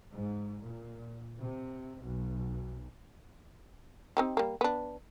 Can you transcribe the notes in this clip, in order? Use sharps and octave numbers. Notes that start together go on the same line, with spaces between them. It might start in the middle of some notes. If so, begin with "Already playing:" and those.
G#2
A#2
C3
B1
C4 D#4 G4
G3 A#3
B3 D4